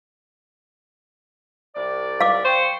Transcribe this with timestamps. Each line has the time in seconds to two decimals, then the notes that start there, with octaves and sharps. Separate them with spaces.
1.76 C2 D5
2.21 F5 D6
2.45 C5 G5 C#6